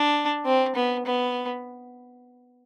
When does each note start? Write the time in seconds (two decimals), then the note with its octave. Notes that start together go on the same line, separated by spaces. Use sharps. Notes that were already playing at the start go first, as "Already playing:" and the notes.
Already playing: D4
0.45 C4
0.76 B3
1.06 B3